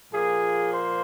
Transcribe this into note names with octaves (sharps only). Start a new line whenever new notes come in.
A#2 F3 A#3 G#4
C5